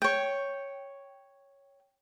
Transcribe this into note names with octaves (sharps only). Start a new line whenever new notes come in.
C#5 G5